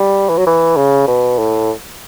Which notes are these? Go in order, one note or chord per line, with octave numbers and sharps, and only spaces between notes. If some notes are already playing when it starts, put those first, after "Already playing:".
Already playing: G3
E3
F#3
E3
C#3
B2
A2